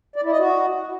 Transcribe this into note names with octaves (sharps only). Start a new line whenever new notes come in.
D5
E4
D#5
F#4